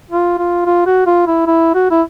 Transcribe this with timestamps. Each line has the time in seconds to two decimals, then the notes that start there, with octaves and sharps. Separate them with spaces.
0.11 F4
0.39 F4
0.65 F4
0.86 F#4
1.06 F4
1.27 E4
1.47 E4
1.75 F#4
1.91 E4